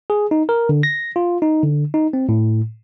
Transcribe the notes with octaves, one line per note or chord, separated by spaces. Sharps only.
G#4
D#4
A#4
D3
A#6
F4
D#4
D3
D#4
C4
A2